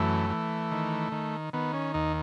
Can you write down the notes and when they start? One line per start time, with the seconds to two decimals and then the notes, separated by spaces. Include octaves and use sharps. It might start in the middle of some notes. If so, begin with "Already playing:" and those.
Already playing: F#2 E3 A3
0.30 E3
0.72 D#3
1.12 D#3
1.53 D#3 B3
1.74 C#4
1.94 D#2 D#4